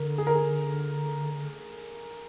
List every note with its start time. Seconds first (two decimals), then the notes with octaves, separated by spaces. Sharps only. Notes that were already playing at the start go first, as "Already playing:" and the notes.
Already playing: D3 A#4
0.18 G#4
0.27 A#4
0.35 G#4